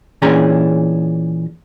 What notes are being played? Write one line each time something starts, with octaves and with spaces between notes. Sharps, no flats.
A#2 E3 C#4 D4 G#4 A#5